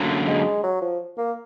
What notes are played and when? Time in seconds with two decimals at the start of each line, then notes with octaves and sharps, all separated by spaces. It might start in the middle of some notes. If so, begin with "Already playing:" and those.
Already playing: F#2 D3 F#3 A#3
0.27 G#3
0.63 F#3
0.82 F3
1.18 A#3